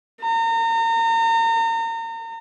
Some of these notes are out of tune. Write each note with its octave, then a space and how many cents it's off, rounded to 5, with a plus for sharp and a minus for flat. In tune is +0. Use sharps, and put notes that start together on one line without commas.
A#5 -35